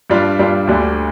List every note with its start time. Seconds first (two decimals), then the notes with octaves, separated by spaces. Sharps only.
0.10 G2 G3 D4 F4
0.39 G2 G3 D4 F4
0.67 D2 D3 G3 D4